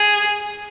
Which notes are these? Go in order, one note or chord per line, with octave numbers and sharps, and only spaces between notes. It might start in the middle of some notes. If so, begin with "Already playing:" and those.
Already playing: G#4